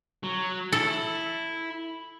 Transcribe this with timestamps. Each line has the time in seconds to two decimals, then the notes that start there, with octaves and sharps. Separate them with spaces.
0.23 F#3
0.72 E4 A4